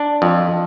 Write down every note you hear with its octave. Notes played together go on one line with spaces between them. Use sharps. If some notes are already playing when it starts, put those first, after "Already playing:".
Already playing: D4
F2